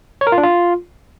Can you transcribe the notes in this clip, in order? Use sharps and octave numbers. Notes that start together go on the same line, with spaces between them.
C#5
A#4
F4
D4
F4